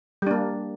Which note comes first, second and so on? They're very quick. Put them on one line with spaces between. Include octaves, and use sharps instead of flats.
G3 D4 A#3